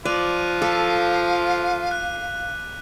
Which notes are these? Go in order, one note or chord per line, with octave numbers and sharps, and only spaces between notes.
F3 F4 D5 F#6 D#7 F7
A4 F5 D6 B6
F#6